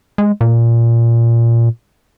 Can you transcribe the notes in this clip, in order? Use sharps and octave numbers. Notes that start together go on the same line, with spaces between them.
G#3
A#2